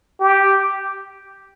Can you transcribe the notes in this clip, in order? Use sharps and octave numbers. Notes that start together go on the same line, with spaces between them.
G4